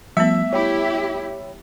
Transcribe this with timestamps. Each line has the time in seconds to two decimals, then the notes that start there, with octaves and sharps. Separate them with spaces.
0.17 F3 G3 A3 B3 E5
0.53 E4 G4 C#5 G5 B5